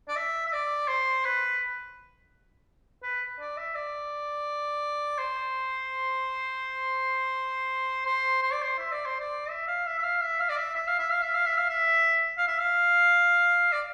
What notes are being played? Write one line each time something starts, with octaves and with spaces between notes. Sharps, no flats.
D5
E5
E5
D5
C5
B4
B4
D5
E5
D5
C5
C5
C5
D5
C5
E5
D5
C5
D5
E5
F5
E5
E5
F5
E5
F5
D5
E5
E5
F5
E5
F5
E5
F5
E5
F5
E5
F5
E5
F5
D5